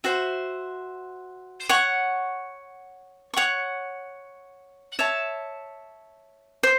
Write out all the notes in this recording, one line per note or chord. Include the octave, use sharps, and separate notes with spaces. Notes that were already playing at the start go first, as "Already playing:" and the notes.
F#4 C5 E5
C#5 F#5 C#6
C#5 F#5 C#6
C#5 E5 A5
C5